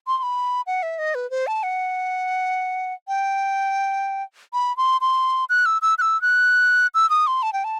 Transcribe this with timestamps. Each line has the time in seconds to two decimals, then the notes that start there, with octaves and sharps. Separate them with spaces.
0.07 C6
0.18 C6
0.23 B5
0.67 F#5
0.83 E5
0.99 D#5
1.15 B4
1.31 C5
1.47 A5
1.63 F#5
3.08 G5
4.53 B5
4.77 C6
5.01 C6
5.49 F#6
5.66 E6
5.82 E6
5.98 F#6
6.02 E6
6.22 F#6
6.94 E6
7.10 D#6
7.27 C6
7.43 A5
7.53 G5
7.64 A5